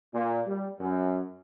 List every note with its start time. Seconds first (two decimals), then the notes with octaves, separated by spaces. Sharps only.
0.14 A#2
0.47 G3
0.79 F#2